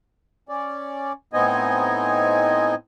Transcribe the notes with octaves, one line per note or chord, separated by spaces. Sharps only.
C#4 D5
A2 B3 C4 D#4 D#5 G#5